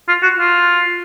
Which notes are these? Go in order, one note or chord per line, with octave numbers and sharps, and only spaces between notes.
F4
F#4
F4